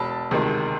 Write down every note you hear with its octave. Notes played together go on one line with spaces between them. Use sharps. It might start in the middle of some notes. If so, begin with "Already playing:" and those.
Already playing: E1 A5 B5
D2 C3 D#3 G#3